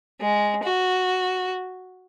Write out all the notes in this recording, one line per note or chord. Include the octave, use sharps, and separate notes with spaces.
G#3
F#4